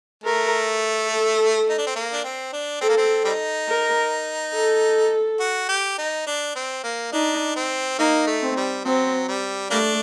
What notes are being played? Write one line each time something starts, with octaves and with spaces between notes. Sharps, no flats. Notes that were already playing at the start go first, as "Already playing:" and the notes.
A3 A#4
A4
D#4
D4
C4
A#3
D4
C4
D4
C4 A4
A#3
C4
G3 C4 D#4
A#4
A4
F#4
G4
D#4
D4
C4
A#3
D4 D#4
C4
A#3 D#4
A3
C4
G3
F#3 C4
G3
G3 A3 A#3 D4